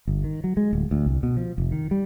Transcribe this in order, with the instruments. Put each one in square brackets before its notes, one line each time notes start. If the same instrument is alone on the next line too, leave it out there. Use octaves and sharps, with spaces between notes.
[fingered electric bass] G1
D#3
F#3
G#3
D1
D2
C2
B2
F3
F1
D#3
G3